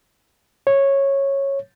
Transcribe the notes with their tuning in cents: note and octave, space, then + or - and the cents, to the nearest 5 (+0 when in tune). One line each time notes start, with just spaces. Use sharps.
C#5 -10